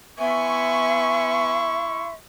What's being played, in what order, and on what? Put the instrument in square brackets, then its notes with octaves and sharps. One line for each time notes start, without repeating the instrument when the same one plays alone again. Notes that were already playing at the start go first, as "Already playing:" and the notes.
[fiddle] B3 G#5 [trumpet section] E4 C6 C#6 [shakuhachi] E5